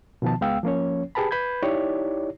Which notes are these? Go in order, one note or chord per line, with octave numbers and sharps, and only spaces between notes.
B2 D#3 F3 B3 A5
C#2 G#3 B3 F5 G5 E6
F3 A#3 C#4 C#5
G4 G#4 B4 A5 B5
B4 B5 G6 G#6
D#4 E4 G4 C#5 D5